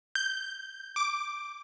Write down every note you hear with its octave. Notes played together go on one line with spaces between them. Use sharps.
G6
D6